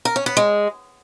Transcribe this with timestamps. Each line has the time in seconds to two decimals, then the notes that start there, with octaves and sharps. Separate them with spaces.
0.05 A#4
0.16 C#4
0.26 B3
0.37 G#3